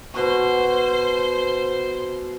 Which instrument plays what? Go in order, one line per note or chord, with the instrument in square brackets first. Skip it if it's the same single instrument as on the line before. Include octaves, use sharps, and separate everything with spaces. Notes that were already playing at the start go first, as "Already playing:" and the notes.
[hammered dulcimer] B2 C#6 [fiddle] C5